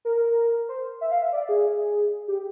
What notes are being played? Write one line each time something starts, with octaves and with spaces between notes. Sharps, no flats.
A#4
C5
E5
F5
E5
D5
G#4
G4